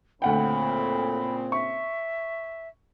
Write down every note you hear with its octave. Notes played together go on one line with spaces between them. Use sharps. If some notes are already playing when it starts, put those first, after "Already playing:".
D2 A#2 C#3 C4 F#5 G5 B5
E5 C#6